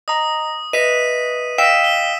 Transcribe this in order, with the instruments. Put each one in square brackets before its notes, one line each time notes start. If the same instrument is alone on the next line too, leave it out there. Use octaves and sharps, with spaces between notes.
[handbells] D#5 A#5 [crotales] D#6
[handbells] B4 D#5 E5 [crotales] B6 D#7
[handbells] D#5 F5 G5 [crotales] E6 B6 E7
[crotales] G7